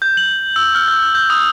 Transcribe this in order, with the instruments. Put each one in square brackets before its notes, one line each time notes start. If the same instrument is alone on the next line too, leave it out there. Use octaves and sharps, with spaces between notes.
[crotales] G6
F#7
E6
F6
G6
G6
D#6